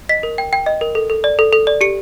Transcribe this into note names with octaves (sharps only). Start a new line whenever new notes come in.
D#5 B6
A#4
G5
G5
D#5
A#4
A4
A4
D5
A4
A4
D5
G4 C#7